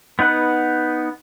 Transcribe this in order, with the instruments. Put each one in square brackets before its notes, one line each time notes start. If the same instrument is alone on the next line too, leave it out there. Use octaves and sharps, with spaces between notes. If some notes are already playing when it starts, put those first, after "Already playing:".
[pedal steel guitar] B3 D#4 B4 F#5